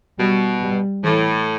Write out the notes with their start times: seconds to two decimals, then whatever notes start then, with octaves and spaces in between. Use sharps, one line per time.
0.18 B2 G3
0.61 G3
1.04 A2 E3